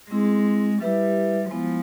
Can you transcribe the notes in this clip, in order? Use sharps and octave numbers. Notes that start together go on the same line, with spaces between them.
G#3 C4 E4 G#4
G3 E4 G4 B4 E5
F3 G#3 B3 E4